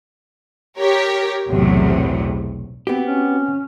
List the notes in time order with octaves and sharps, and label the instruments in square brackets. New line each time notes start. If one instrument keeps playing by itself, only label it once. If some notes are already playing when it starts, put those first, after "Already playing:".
[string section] G4 A#4 C#5
B1 E2 A2 C3 F#3
[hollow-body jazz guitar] B3 G4 [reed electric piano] C4 F#4
[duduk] C#4